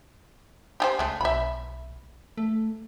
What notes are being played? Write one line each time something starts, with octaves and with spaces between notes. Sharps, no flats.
G4 G#4 C5
C#2 G#3 A3
B1 E5 B5
A3